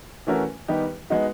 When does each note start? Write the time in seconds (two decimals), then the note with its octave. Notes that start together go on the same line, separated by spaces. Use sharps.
0.27 E3 A3 C#4 F#4 A#4
0.68 D#3 G3 B3 D#4 G4
1.10 G#3 B3 D#4 F#4